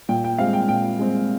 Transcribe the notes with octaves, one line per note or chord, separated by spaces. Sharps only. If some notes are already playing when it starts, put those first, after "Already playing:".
A#2 G5
G5
G#3 C4 F5
G5
A#2 G5
G#3 C4